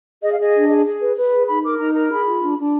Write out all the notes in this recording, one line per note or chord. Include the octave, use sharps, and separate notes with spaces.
G#4 D#5
F5
G#4 D#5
D4
G#4
G#4
B4
B4
G#4
D#4 B5
A#4 D6
D#4 A#5
A#4 A#5
G#4 B5
F4
D4
D4